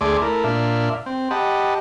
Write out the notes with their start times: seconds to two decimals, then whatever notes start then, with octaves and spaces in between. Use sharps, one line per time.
0.01 D2 A3 G#4 D5 C6 D6
0.22 A3 E4 A#4
0.44 A#2 D4 E5 F5
1.06 C4
1.31 G4 D#5 F#5 A5 B5